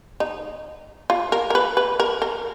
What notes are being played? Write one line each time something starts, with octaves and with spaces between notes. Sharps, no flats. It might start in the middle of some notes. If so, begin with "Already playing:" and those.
D#4
F4
A#4
A#4
B4
B4
A#4
A#4